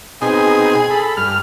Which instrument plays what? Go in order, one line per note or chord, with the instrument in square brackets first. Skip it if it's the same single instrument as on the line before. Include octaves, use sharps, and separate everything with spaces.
[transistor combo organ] B2 C4 D#4 [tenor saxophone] G#4
[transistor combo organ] A4 B5
G2 F6